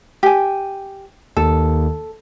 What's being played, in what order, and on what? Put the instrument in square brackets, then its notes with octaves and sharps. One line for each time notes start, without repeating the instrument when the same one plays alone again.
[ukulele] G4 G#5
[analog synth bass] D#2 [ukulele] A4